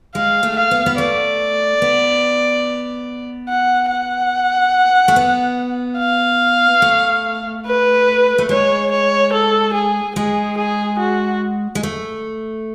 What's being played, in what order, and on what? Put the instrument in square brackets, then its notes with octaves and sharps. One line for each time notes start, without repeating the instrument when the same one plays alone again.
[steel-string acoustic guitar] G#3 [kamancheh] F5
[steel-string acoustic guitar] A3
[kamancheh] F5
[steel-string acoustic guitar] B3
B3
[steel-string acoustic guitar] A3 [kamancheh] D5
[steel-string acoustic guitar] B3
[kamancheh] F#5
F#5
[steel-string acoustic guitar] A3
B3
[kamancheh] F5
[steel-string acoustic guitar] A3
[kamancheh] B4
[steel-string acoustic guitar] A3
[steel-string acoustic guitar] G#3 [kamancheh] C#5
[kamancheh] C#5
A4
G#4
[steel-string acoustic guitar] G#3 [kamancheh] G#4
[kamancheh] G#4
F#4
[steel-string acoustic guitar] G#3
A3